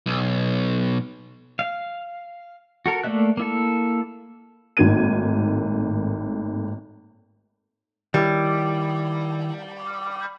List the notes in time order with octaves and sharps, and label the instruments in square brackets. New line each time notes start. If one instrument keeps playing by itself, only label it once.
[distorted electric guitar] B1
[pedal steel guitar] F5
F#4 A4 A#4
A3 A#3 D5 E5 F#6
A#3 E4 A4
[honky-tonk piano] G#1 A2 D#3 A#3 G#6 D#7
[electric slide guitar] D#3 E4 C#5 [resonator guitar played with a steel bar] G3